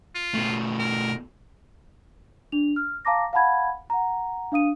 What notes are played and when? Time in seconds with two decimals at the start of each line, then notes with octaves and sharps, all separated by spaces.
0.15 F4
0.34 B2 A3
0.79 A#4
2.52 D4 F7
2.76 F6
3.05 F5 A5 A#5 D6 A#6
3.33 F5 F#5 A5 B5 G#6
3.90 F#5 A#5
4.52 D4 F5 D#6 D#7